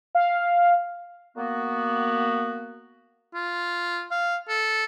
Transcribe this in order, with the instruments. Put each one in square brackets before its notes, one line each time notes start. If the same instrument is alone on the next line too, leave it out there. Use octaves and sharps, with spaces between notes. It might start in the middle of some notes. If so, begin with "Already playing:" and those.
[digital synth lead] F5
[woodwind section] A#3 B3 F#4
[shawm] F4
F5
A4